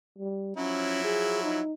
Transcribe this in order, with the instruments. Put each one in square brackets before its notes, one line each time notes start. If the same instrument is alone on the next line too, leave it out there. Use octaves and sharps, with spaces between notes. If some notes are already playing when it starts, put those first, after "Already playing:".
[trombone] G3
[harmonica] F3 F#3 E4 [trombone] C#4
[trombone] G#4
D#4